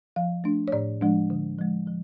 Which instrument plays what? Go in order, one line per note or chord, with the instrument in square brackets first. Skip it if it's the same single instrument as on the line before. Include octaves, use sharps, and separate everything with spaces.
[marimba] F3 F5
A3 D4
C#5
A2 D5
F3 G#3 D4
D3
F3 G#3
F3